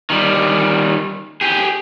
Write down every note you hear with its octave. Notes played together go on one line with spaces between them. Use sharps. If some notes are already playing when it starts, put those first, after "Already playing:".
D#3 G3
G4 G#4